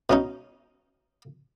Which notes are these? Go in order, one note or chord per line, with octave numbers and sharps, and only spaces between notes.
B2 C#4 D#4